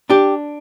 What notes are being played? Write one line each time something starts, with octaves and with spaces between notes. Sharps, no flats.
D4 G4